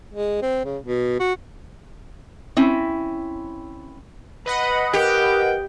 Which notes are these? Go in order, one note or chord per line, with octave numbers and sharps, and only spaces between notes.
G#3
C4
C#3
B2
F#4
C4 C#4 E4
B4 D#5 F#5 B5
G4 A#4 G5